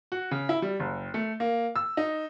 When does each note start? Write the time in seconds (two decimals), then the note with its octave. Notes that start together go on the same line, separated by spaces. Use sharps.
0.12 F#4
0.31 C#3
0.49 E4
0.62 G3
0.80 F#1
1.14 A3
1.40 A#3
1.76 E6
1.97 D#4